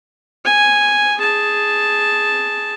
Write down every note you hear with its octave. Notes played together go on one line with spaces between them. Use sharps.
G#5
G#4 A5